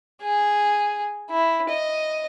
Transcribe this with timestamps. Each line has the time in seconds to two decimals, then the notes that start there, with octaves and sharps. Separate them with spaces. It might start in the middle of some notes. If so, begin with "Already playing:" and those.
0.22 G#4
1.31 E4
1.69 D#5